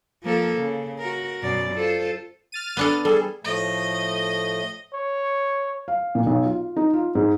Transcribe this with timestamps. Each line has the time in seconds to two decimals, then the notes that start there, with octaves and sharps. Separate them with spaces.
0.23 F3 A#3 A4
0.58 C#3
0.99 F#4 A#4
1.42 F#2 B2 D5
1.74 F4 A4 C5
2.52 F6 A6 D#7
2.77 B3 D4 A4
3.05 G3 G#4 A4
3.44 A2 F3 A3 D#5
4.93 C#5
5.88 F5
6.15 A#2
6.26 B1
6.45 F4
6.76 D#4
6.93 F4
7.15 G#2